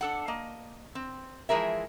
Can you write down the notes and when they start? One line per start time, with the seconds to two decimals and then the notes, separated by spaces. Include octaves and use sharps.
0.01 D4 A4 F#5
0.28 A#3 D#5
0.95 C4
1.49 E3 F3 G#3 G#4 A#4 E5